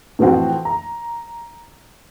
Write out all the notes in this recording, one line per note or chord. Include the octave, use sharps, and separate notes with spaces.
A2 E3 F3 C4 F#4
A#5